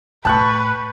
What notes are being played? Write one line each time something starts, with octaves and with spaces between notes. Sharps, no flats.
A2 B4 G5 A5 C#6 F#6